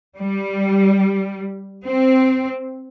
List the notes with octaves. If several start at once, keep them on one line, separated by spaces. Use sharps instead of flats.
G3
C4